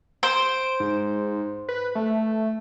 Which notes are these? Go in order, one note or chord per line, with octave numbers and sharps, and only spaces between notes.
C5 D7
G#2
B4
A3